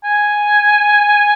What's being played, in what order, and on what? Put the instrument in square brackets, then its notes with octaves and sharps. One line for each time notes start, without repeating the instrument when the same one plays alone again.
[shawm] G#5